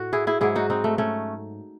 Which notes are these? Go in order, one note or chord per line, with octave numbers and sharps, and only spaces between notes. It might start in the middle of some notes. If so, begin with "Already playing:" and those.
Already playing: A2 F#4
E4 G#4
E4 G#4
G#2 F#3 E4 G#4
D#4 F#4
C4 D#4
A3
A3 C#4